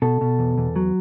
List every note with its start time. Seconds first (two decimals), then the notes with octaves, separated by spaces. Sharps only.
0.02 B2 A4
0.21 B2
0.39 E2
0.58 E2
0.76 F#3